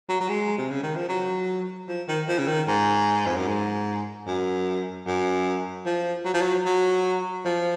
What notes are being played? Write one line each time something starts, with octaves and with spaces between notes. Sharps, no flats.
F#3
F#3
G#3
C3
C#3
D#3
F3
F#3
F3
D#3
F3
C#3
D#3
G#2
F2
F#2
G#2
F#2
F#2
F3
F#3
F3
F#3
F#3
F3